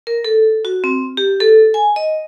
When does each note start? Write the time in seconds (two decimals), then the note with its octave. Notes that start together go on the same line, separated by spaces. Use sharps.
0.07 A#4
0.25 A4
0.65 F#4
0.84 C4
1.17 G4
1.40 A4
1.74 G#5
1.96 D#5